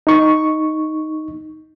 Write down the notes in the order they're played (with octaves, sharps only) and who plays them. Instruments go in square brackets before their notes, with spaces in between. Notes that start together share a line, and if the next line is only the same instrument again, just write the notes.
[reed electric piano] D#4 C#6